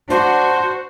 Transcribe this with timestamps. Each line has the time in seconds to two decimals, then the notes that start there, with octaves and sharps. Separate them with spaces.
0.10 D4 F#4 C5